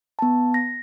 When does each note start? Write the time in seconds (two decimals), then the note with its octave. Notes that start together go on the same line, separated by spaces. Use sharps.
0.19 B3 A5
0.54 A#6